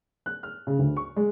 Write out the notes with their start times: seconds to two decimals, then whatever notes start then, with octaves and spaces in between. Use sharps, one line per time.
0.26 F#6
0.43 F6
0.67 C#3
0.79 D2
0.97 C#6
1.16 G#3